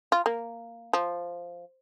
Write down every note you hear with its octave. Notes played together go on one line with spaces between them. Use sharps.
F4
A#3
F3